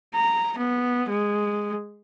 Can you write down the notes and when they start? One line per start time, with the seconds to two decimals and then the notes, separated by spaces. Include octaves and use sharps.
0.15 A#5
0.58 B3
1.09 G#3